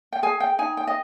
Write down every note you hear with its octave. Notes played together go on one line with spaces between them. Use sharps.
G5
G#4 G#5
G5
D#4 G#5
G5
D#5